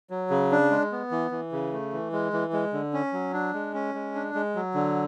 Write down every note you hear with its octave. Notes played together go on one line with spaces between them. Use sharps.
F#3
C#3
D4
G#3
B3
E3
E3
C#3
A3
E3
G#3
E3
G#3
D3
C#4
F#3
D4
G#3
C#4
G#3
D4
G#3
F#3
D3